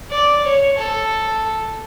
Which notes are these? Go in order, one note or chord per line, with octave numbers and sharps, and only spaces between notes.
D5
C#5
A4